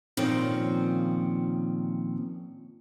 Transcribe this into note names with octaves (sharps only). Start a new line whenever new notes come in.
A#2 D#3 F3 C4 C#4